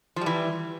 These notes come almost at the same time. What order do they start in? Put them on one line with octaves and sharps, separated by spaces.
F3 G3 E3